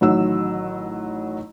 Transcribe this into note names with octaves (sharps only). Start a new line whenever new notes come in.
A1 D#3 F#3 E6